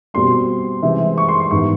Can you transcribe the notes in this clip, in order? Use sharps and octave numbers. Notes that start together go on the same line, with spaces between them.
B2 G3 C4 C6
C3 E3 G#3 C4
C#6
C6
C6
G#2 E3 G3 B3 C#6